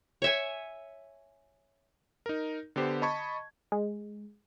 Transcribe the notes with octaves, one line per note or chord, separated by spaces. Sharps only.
C#5 E5 G#5
D#4 A#4
D3 B3 G4 C5
D#5 A5 B5 C#6 G#6
G#3